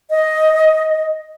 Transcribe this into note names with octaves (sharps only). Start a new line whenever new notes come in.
D#5